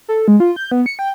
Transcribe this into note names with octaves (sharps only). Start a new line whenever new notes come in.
A4
G#3
F4
G6
B3
C#7
G5